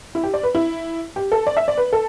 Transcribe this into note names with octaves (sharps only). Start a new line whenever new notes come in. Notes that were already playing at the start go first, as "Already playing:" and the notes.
E4
G4
D5
B4
E4
G4
A4
D5
E5
D5
B4
A4